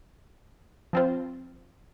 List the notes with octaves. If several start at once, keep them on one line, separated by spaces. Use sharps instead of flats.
F3 C4 F4 C5